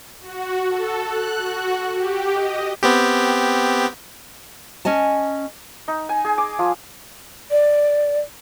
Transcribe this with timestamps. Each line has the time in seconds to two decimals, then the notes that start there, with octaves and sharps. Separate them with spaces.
0.21 F#4
0.69 A4
1.03 F#6
1.39 F#4
1.93 G4
2.33 D#5
2.83 B3 C4 G4
4.85 C#4 D#5 G#5 A5
5.88 D#4
6.09 G#5
6.25 G#4
6.38 D6
6.59 F3
7.51 D5